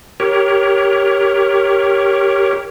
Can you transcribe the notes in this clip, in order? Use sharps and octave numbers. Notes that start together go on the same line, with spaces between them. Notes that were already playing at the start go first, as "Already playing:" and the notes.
G4 A#4 C#5